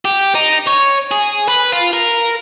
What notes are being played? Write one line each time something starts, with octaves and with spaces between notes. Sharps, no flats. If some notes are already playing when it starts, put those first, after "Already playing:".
G4
D#4
C#5
G#4
B4
F4
A#4